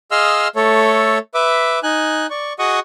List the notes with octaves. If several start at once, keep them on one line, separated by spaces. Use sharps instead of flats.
G#4 D#5 F5 C6 E6 F6
A3 A4 C#5
B4 E5 D6
D#4 G#5 F#6
D5 C#6
F#4 G#4 D#5 F#5 C#6 D#6